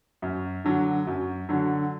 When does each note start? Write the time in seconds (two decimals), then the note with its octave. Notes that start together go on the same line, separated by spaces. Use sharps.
0.22 F#2
0.65 D3 F#3
1.07 F#2
1.49 D3 F#3